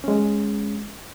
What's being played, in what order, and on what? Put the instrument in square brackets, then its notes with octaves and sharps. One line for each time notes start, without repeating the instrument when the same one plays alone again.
[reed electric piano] G#3 C#4